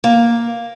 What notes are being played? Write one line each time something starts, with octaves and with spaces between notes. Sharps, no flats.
A#3